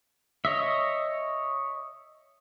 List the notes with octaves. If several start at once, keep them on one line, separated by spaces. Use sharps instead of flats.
C#5 D#5 E5